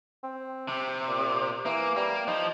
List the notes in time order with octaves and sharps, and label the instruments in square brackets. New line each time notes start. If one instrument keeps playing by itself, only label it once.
[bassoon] C4
[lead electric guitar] C3
[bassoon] A#2
[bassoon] E3 [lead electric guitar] A#3
[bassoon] G3 [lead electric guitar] A#3
[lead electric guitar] F3 [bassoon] D#4